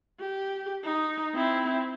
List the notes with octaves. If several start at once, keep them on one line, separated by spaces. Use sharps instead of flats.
G4
D#4
C4 E4